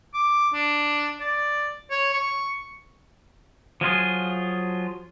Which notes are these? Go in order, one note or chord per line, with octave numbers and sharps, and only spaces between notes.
D6
D4
D5
C#5
C#6
F3 F#3 F4 G#4